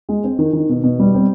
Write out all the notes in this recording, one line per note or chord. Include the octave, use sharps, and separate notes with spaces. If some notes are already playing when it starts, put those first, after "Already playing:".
G#3
C4
D#3
D#3
B2
B2
G3
C4